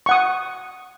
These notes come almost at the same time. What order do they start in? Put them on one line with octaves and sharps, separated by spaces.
C#6 F#5 D#6